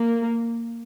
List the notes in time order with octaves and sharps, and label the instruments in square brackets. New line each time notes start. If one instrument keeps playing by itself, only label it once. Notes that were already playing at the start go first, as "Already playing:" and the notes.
Already playing: [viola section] A#3